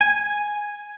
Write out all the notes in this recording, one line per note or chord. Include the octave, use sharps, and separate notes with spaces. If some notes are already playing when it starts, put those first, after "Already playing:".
G#5